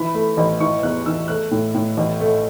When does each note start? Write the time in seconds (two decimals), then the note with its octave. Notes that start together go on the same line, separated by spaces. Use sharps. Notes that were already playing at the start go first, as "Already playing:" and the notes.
Already playing: E3 B5
0.14 A3
0.37 A1
0.49 B5
0.60 E3 C#6
0.82 E2 F#6
1.06 E3 E6
1.28 A3 F#6
1.51 A2
1.74 A2
1.97 A1
2.20 A3